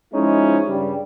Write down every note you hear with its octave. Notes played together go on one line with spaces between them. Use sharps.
F3 G#3 C#4 D#4 E4
G2 C#3 G3